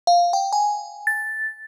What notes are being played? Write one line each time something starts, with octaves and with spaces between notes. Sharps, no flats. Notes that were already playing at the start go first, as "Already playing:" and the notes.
F5
G5
G#5
A6